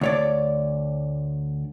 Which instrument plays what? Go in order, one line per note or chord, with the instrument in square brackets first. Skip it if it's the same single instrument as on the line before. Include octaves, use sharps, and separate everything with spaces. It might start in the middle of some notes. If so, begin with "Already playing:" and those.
[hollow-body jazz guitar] D2 C#5 D5